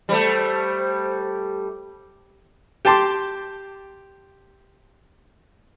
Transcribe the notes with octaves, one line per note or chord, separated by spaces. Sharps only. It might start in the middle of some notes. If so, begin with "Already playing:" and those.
G3 A3 C5
G4 G5 A5 C6 D6